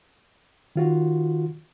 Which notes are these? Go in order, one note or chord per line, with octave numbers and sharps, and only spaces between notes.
D#3 F4 F#4